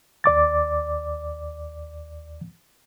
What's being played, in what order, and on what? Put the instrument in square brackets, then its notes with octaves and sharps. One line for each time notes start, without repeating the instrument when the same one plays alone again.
[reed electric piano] D#2 D5 D6 A6